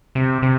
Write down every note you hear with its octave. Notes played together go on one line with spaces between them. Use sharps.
C3
C3